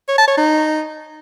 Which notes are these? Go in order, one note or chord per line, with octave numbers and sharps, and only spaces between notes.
C#5
A5
C#5
D#4